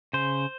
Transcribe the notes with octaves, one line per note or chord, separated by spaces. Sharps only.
C#3 C5